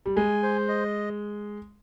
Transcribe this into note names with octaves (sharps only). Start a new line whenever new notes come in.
G3
G#3 G#5
C5
D#5